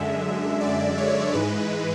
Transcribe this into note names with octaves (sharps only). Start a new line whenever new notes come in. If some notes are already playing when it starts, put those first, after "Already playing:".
Already playing: F#2 D3 G#3 E5
D5
C#5
G#2 E3 G#3 B4